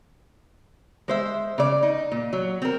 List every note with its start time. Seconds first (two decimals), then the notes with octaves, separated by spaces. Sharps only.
1.08 G#3 C5 E5
1.58 C#3 D5
1.83 D#4
2.12 A#2
2.33 F#3
2.62 C4 A#4